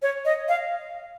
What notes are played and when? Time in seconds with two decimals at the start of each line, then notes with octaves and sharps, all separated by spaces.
0.02 C#5
0.25 D#5
0.48 F5